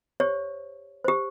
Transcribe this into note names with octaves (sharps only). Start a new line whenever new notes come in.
G4 C5 C#5
G4 C5